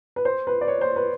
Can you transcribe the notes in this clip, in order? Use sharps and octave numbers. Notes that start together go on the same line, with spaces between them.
B4
C5
B4
D5
C#5
C5
B4